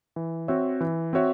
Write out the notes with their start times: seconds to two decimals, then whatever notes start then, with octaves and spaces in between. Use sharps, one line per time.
0.16 E3
0.48 C4 F#4 C#5 E5
0.81 E3
1.13 C4 F#4 C#5 E5